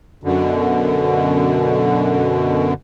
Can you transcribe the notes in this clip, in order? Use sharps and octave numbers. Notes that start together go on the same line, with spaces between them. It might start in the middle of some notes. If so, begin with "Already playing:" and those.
F#2 B2 D3